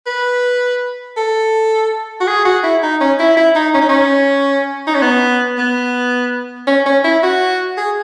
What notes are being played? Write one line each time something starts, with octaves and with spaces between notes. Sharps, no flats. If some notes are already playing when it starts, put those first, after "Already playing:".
B4
A4
F#4
G#4
F#4
E4
D#4
C#4
E4
E4
D#4
C#4
D#4
C#4
D#4
C#4
B3
B3
C#4
C#4
E4
F#4
G#4